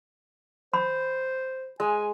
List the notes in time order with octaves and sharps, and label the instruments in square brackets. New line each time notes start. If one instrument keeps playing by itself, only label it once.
[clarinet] C5 [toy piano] B5
[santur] G#3 [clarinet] G#5